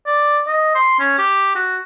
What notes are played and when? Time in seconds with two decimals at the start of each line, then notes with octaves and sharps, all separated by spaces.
0.06 D5
0.47 D#5
0.75 C6
1.00 C#4
1.18 G4
1.56 F#4